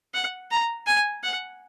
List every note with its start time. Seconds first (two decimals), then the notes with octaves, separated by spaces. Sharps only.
0.14 F#5
0.51 A#5
0.87 G#5
1.23 F#5